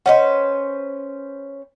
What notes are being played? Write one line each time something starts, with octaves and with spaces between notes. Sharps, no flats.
C#4 B4 C5 D#5 F#5